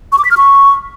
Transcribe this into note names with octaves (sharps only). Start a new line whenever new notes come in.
C#6
D6
B6
F6
C#6